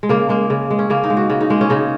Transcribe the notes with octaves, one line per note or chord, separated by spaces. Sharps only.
G#3
C#3 A#3
G#3 A#3
C#3
G#3
C#4
C#3 A#3
D#4
G#3
F#4
C#3 F#4
D#4
G#3 A#3
C#4
C#3 D#4